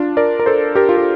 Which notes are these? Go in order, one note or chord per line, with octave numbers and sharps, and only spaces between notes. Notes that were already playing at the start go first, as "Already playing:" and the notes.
Already playing: D4 F4
A#4 D5
A#4
A4 C5
G4 A#4
F4
G4